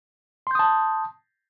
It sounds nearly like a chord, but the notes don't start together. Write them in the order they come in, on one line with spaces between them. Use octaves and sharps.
C6 G6 D#6 A5